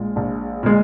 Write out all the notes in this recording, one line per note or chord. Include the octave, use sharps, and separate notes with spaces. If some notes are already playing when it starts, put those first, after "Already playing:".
Already playing: A#1 A#2 G#3
A#1
A#2 G#3